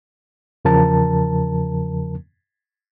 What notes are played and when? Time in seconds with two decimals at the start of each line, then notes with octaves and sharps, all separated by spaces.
0.65 E2 C#3 F3 A#4 A5